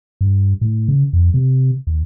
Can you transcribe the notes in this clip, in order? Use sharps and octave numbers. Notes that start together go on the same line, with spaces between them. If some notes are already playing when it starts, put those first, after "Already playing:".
G2
A2
C#3
F2
C3
D#2